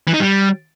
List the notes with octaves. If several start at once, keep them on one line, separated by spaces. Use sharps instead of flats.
E3
D#4
G3